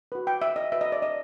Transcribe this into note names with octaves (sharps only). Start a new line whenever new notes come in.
F#4 B4
G5
E5
D#5
F#4 B4 E5
D#5
D5
D#5